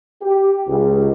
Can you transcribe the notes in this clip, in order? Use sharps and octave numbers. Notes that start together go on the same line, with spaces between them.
G4
C#2